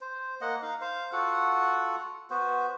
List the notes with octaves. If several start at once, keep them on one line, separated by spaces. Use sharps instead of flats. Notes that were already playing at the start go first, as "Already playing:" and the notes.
C5
A#3 D#5 F#5
D#4 F5
C5 F5
F4 F#4 A4 F#5
B3 F#4 C5